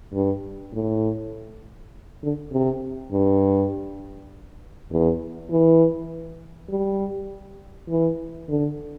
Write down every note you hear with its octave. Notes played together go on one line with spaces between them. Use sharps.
G2
A2
D3
C3
G2
E2
E3
G3
E3
D3